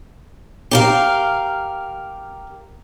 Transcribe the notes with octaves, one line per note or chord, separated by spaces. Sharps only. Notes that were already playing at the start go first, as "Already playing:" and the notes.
G4 A#4 F5